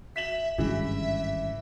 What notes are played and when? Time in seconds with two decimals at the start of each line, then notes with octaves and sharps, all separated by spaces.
0.16 E5 B6 E7 F#7
0.58 G#1 G2 C#3 E3 E5